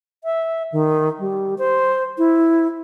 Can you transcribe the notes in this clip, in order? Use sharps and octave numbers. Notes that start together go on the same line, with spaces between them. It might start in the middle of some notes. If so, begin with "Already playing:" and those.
E5
D#3
G3
C5
E4